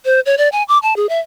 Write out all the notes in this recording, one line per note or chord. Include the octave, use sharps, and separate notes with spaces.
C5
C#5
D5
G#5
D6
A5
G#4
E5